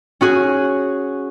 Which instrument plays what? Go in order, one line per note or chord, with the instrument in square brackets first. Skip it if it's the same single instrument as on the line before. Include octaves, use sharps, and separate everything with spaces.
[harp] C#4 F#4 G#4